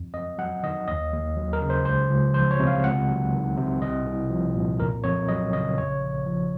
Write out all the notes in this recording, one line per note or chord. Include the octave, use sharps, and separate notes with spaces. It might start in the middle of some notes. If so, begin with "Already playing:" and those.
Already playing: F2
F2 D#5
F#3 F#5
D#3 D#5
D#2 D#5
D#2
F#3
A#4
C#3
C5
C#2 C5
C#2
F3 C5
C#5
C3
F5
C#2 F#5
F#3
D#3
C3
C2 D#5
C2
F3
A#2
F2 A#4
F2 C#5
F#3 D#5
C#3 D#5
A#1 C#5
A#1
F3